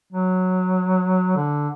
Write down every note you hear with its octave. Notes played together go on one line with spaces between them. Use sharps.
F#3
D3